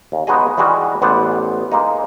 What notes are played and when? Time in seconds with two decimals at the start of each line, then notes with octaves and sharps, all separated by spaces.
0.12 D#2
0.27 G#3 B3 D#4 F#4 G#4 D#5
0.57 E3 G3 G#3 F#4 G#4
1.02 A1 B3 C5 D5 F#5
1.72 G#3 A#3 D#4